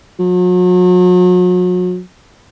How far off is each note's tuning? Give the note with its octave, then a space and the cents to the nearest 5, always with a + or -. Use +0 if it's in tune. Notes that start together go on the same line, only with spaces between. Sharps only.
F#3 -40